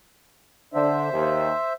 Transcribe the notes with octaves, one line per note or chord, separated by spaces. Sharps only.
D3 D4 C5 E5
D#2